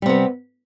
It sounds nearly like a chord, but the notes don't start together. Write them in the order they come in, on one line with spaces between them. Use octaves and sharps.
G3 C3 B3